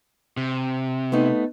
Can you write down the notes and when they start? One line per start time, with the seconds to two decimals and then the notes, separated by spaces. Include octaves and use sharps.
0.37 C3
1.12 A3 B3 D#4